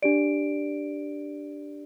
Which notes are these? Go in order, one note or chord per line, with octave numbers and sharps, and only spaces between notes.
D4 G4 D5 D7